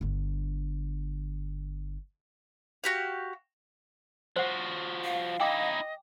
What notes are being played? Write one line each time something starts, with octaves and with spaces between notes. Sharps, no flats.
G1 D3
F#4 G4 F5
F3 F#4 C5 F#5
F5
D#4 E4 D#5 G5 G#5 D6